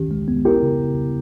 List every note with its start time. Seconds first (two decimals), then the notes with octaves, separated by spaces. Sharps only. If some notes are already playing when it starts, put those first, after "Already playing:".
Already playing: D#3 C#4 G4
0.11 G#3
0.28 B3
0.45 E4 G4 A#4
0.63 C#3